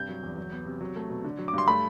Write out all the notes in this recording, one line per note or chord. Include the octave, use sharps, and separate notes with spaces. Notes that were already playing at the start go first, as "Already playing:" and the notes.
Already playing: G2 C3 G6
F#3
E2
F#3
B3
C3
F#3
A3
B2
D3
F#3
D6
G2 C6
A3 B5